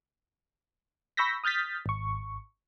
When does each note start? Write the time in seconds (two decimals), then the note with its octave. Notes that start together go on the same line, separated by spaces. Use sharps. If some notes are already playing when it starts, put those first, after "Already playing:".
1.17 B5 C#6 E6 G6 A#6 B6
1.44 D#6 F6 G6 A6 B6
1.86 G#1 C#6